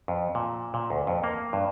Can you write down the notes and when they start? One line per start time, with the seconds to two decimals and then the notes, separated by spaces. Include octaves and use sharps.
0.08 F2
0.35 A#2
0.74 A#2
0.90 D2
1.07 F2
1.24 A#3
1.53 G2